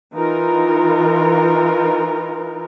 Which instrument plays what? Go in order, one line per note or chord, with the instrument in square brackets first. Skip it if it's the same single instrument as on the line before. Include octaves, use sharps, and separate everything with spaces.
[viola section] E3 D#4 F4 A#4